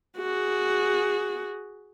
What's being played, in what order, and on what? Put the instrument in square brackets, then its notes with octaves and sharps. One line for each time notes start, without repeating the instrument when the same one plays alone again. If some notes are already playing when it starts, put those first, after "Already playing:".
[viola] F#4 G#4